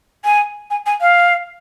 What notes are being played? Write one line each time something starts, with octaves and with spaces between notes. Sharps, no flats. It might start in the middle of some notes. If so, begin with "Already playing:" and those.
G#5
G#5
G#5
F5